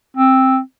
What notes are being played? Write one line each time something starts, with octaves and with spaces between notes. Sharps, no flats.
C4